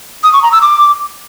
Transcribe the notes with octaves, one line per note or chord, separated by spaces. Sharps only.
D#6
C#6
A#5
E6
D6